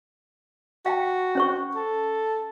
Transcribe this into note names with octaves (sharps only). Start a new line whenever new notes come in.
F#4 F5 G5 A5
C#4 C5 C#6
A4